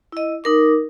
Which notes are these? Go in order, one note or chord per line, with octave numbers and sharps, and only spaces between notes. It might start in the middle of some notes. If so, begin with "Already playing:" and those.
E4 D#5
D#4 A#4 D6